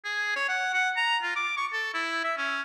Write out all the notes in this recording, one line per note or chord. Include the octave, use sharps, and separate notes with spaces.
G#4
C#5
F#5
F#5
A#5
F4
D6
C#6
A4
E4
E5
C#4